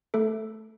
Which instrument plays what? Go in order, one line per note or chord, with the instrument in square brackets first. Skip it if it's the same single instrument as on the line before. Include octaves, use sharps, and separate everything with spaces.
[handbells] A3 A4